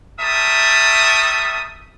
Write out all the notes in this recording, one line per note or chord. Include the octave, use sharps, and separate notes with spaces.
G3 A3 A#4 E5 A5 D#6